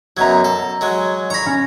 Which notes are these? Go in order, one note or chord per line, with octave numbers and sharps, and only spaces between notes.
F#2 B2 F#3 A#5 G#6
A4
F#3 G#3
C#5 A#5 B5 A#6
C#4